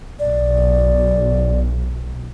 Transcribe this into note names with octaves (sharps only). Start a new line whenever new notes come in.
B1 D5